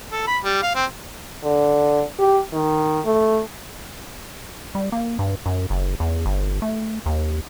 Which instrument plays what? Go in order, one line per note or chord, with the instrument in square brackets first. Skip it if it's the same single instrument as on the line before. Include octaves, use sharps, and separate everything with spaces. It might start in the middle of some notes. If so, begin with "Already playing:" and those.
[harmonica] A4
B5
G3
F5
C4
[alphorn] D3
G4
D#3
A3
[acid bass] G3
A#3
G2
F#2
F#1
E2
G1
A3
D#2